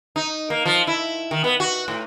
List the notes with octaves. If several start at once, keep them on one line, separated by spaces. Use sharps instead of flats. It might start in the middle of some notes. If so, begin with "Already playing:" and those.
D#4
A#3
F3
E4
D#3
B3
F#4
A2